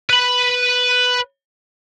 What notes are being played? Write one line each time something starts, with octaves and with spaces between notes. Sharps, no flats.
B4 B5